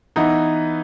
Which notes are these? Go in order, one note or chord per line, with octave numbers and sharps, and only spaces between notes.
E3 B3 D#4 E4